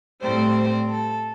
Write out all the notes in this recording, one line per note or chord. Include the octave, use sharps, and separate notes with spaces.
A2 G3 C4 C5
C5
A4